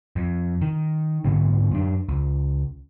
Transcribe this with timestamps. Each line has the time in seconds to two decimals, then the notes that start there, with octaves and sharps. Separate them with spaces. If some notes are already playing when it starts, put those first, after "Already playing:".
0.16 F2
0.61 D#3
1.25 D2 G#2 D3 B3
1.71 F#2 D4
2.09 C#2